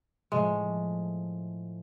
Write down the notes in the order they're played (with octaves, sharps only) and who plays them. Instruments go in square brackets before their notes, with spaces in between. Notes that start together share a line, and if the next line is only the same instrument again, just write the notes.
[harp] A2 F3 A3 [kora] G#3